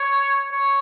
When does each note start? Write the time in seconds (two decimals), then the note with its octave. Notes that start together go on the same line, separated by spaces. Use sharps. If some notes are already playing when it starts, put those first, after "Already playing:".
Already playing: C#5
0.51 C#5